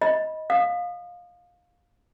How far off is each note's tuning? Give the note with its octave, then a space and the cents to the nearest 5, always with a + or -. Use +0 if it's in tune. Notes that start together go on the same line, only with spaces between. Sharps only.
D#5 +15 B5 -15
F5 +20 D#6 -30